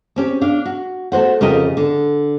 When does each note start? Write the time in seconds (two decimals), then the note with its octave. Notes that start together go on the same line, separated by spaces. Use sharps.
0.16 C4 C#4 G4
0.41 D4 F5
0.65 F#4
1.12 A3 F#4 C5 F#5
1.41 F2 C#3 G4 A#4 D#5
1.77 D3